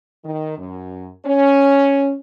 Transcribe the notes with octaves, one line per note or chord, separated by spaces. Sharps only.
D#3
F#2
C#4